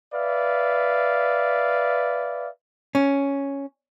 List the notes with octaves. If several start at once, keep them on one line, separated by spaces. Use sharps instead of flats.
B4 D5 E5 F5
C#4